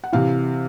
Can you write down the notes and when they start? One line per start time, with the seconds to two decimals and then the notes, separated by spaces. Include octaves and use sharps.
0.04 F#5
0.12 C3 E3 F5